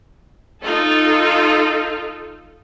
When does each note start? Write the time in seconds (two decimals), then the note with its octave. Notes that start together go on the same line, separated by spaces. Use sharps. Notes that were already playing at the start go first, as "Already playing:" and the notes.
0.62 D#4 F4 A4